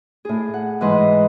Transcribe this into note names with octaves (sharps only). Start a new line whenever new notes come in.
A2 G#4
F#5
G#2 E3 G#3 B4 D#5 C6